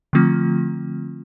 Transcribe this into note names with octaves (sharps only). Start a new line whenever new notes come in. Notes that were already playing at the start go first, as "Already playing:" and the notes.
D3 F3 A3 C4 F4